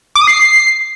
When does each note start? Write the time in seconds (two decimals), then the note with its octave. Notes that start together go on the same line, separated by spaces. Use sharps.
0.15 D6
0.21 D#6
0.27 C7